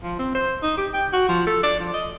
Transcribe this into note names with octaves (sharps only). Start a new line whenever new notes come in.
F3
C4
C5
D#4
G4
G5
F#4
F3
A4
D5
F3
D#5